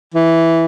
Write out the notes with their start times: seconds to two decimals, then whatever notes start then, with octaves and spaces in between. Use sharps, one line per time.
0.14 E3